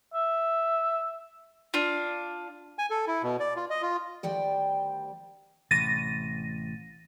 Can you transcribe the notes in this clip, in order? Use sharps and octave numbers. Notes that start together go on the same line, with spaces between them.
E5
D4 F4
G#5
A4
E4
B2
D5
F4
D#5
F4
D2 D#3 G3 C5 D5 G5
A1 C3 A6 A#6 D#7